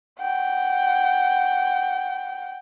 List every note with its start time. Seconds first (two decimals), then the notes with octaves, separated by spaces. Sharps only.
0.19 F#5 G5